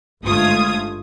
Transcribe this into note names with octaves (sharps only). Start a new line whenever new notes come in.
G1 G#2 A3 F4 D#6 G#6